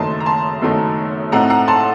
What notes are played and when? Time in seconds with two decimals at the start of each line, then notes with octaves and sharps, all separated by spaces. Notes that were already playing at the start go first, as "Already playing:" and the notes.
Already playing: F#1 F#2 D#3 A3 D#4 A5 C6
0.20 A#5
0.26 A5 C6
0.62 F#1 F#2 D#3 A3 D#4
1.32 A2 A3 C4 D#4 F#5 A#5
1.50 F#5 A#5
1.68 A5 C6